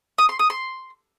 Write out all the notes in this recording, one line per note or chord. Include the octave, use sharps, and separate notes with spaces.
D#6
C6
D#6
C6